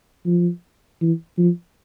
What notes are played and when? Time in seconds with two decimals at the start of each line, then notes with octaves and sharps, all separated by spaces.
0.26 F3
1.01 E3
1.38 F3